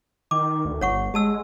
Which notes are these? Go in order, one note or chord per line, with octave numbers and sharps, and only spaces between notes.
D#3 D6
D2
G1 C#5 F#5 C#6
G#3 G4 A5 E6